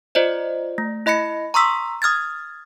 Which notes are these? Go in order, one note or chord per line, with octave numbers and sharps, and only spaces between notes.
F4 C5 D5 D#5
A3
E4 D#5 B5 A#6 C#7
A#5 C6 C#6 D#6 E6 B6
D#6 F6 G#6 A6